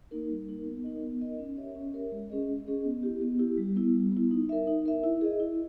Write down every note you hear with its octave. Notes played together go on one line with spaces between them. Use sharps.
A#3 D#4 A#4
G3
A#3 D#4 A#4
B3
D#4 A#4 D#5
B3
D#4 A#4 D#5
C#4
G4 A#4 C#5 E5
C#4
G4 A#4 C#5 E5
G#3
C#4 G#4 D#5
G#3
C#4 G#4 D#5
B3
E4 G4
B3
E4 G4
G3
B3 E4
G3
B3 E4
D#4
A#4 E5
D#4
A#4 E5
E4
G#4 D#5
E4